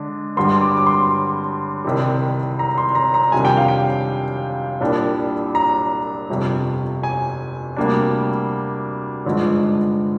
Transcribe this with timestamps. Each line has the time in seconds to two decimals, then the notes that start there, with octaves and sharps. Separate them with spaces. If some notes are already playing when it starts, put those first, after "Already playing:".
Already playing: D3 G#3 D4
0.37 G2 D3 G3 C6
0.61 D6
0.77 D6
0.87 C6
1.84 C2 C3 D#3 G3
2.59 A#5
2.78 C6
2.95 A#5
3.14 A#5
3.32 F2 C3 D#3 G3 D4 G#5
3.45 G5
3.57 F5
3.68 G5
4.81 C2 A#2 G3 D4
5.55 A#5
6.30 G1 F2 C3
7.03 G#5
7.76 D2 C3 G3 A#3 D4
9.26 G#1 G2 D3 F3 G#3